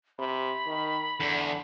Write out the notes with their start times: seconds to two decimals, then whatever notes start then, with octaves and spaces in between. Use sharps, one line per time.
0.19 C3 B5
0.66 D#3
1.20 E2 D3